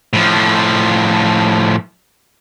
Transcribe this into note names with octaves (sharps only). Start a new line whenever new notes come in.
A2 F3